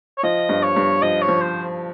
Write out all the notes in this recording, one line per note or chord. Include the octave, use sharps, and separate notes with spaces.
C#5
F3 D#5
G2
C#5
G2
F3 D#5
C#5
F3
C5